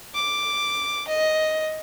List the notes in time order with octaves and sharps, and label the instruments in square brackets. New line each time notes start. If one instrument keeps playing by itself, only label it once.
[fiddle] D6
D#5